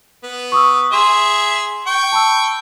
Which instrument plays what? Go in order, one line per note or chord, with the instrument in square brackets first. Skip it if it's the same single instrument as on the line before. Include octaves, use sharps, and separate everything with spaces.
[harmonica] B3
[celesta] C#6 D#6 E6
[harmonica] G#4 E5 [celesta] C6
[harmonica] G5 C#6
[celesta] A5 B5 E6